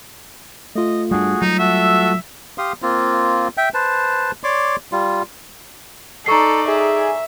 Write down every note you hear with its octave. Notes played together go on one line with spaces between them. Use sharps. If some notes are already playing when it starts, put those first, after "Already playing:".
A3 F4 D#5
G3 D4 F#4 G#4
F#3 G3 D#4
F#4 A4 E5
G4 F5 C6 D#6
A#3 C4 F4
E5 G5
B4 C5 A5
C#5 D5 C6 D6
G3 F4
D#4 A4 D5 A#5 C#6 C7
G#4 E5